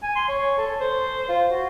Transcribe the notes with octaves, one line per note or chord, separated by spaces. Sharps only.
G#5
C6
C#5
A4
C5
F4
F#4